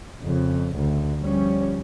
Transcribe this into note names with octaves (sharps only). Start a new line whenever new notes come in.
F2 C#3
D2
F3 G3 C#4